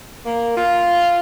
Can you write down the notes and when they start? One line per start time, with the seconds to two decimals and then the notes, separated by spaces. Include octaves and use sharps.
0.25 A#3
0.56 F4